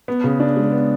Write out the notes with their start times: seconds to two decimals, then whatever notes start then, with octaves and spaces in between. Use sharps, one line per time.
0.08 B3
0.24 C#3
0.40 D4
0.56 G#3
0.72 B3